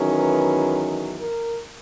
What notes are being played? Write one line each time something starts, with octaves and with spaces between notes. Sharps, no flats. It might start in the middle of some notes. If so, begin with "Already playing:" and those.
Already playing: E2 D#3 F#3 C#4
B4
A#4